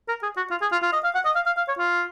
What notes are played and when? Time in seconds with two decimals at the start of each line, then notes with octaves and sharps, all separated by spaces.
0.08 A#4
0.22 G#4
0.37 F#4
0.50 F4
0.61 G#4
0.72 F4
0.82 F4
0.93 D#5
1.04 F5
1.15 F#5
1.25 D#5
1.35 F5
1.46 F5
1.57 F5
1.68 C#5
1.78 F4